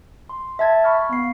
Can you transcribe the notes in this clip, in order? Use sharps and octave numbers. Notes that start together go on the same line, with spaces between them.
C6
E5 A5 G#6 A6
B5 C#6 F6 G#6
B3 F5 C7